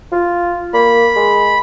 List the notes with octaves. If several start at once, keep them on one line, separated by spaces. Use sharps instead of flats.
F4
A#3 B5
G#3